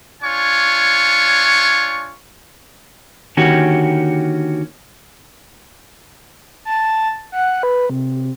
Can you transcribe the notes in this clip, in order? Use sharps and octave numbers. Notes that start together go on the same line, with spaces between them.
D4 F4 C#5 G#5 C#6
D3 D#3 A#3 C#4 F#4 G4
A5
F#5
B4
C3